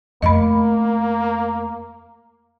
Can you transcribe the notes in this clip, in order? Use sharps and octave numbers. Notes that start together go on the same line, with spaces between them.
F2 A3 A#3 D#5 B5